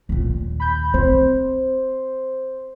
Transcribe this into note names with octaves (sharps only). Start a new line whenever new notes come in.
D#2 A#2
B5 G6
C4 C5